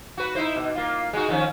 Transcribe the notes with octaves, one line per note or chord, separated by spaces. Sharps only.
F#4 B4
D#4 E4 C5
B2
A#3 F4
G#3 D#4 F#4
D#3 F3 C#4